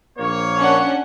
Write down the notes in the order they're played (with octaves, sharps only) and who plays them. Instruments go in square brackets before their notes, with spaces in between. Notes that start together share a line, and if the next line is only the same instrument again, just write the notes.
[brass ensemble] A#1 A#3 C#5
[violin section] C#4 D4 F#5